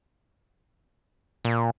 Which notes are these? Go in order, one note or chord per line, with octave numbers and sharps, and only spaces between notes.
A#2